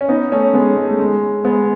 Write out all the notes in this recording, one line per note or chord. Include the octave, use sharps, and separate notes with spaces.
C#4
B3 D#4
A3 C#4
G#3 B3
G#3
A3
G#3
G#3 B3